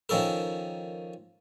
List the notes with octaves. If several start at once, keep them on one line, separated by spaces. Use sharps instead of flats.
D#3 F3 C#4 A4 A#4